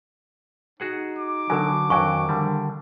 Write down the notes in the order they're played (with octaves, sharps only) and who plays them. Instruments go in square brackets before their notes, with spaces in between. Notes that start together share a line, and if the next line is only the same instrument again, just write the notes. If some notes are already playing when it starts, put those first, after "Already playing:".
[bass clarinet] D#4 [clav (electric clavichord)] F#4 G#4 F#5
[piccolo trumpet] D6
[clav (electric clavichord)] D3 F#3 [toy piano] D4 A4 G#5
[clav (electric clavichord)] F2 F#3 [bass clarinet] D#3 [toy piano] G#5 C#6
[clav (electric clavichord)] D3 G3